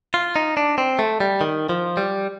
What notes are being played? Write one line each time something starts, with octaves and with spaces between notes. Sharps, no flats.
F4
D#4
D4
C4
A3
G3
D#3
F3
G3